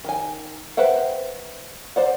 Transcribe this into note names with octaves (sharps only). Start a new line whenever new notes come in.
D#3 G#5
B4 C5 E5 F#5 G5
C5 D5 F#5